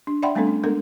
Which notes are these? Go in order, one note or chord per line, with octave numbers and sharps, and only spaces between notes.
D4
D5 E5 F#5 G5 B5 C6
G3 A3 B3 C4 D4 A4
C#4
G#3 B3 D4 A4 A#4